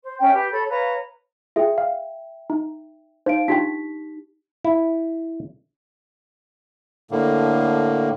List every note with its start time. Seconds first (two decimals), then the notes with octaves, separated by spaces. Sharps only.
0.03 C5
0.19 C#4 E5 G5
0.33 G4 B4
0.51 A4 C#5 B5
0.70 B4 C#5 F5 A#5
1.56 F4 G#4 E5 G5
1.78 F5
2.50 D#4
3.26 D#4 C5 F5 D7
3.48 D4 D#4 F4 G4 G5 B6
4.65 E4
7.11 A2 D3 A#3